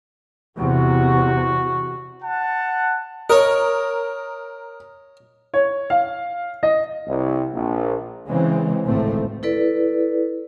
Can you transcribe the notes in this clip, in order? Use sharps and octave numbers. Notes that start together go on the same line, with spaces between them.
E2 C3 F#4
F#5 A5
A#4 C#5 D#5
C#5
F5
D#5
C2
A#1
C#3 E3 G#3 C4
G#1 C#2 A2 A3 C4
E4 A4 B4 D5